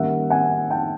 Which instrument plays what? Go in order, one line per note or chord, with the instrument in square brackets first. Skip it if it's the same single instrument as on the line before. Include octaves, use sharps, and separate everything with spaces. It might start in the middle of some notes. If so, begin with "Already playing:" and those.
Already playing: [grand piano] D#3 G3 A#3 C#4 E5 F#5
F#5 G#5
G5 A5